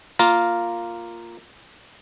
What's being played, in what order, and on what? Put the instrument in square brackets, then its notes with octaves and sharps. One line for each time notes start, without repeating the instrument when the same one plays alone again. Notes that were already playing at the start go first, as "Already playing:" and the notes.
[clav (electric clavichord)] A#3 F4 A#4